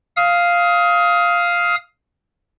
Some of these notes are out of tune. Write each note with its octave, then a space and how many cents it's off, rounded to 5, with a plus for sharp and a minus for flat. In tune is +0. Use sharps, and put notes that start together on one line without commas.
F5 +0 D#6 +25